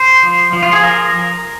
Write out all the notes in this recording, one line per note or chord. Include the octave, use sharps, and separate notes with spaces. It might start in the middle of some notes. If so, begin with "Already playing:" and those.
Already playing: C5
F3
F3
F4
G#4
F3 A#4